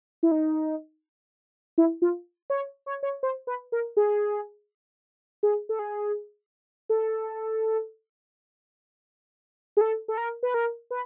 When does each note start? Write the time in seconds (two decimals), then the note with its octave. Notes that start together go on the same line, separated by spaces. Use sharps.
0.23 E4
0.31 D#4
1.78 E4
2.02 F4
2.50 C#5
2.86 C#5
3.03 C#5
3.23 C5
3.47 B4
3.72 A#4
3.97 G#4
5.43 G#4
5.69 A4
5.79 G#4
6.89 A4
9.77 G#4
9.81 A4
10.08 A4
10.17 A#4
10.43 B4
10.54 A#4
10.91 B4